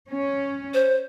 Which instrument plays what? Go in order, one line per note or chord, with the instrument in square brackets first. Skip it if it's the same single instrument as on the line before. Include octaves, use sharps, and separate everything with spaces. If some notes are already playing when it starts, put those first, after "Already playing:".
[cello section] C#4
[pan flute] C5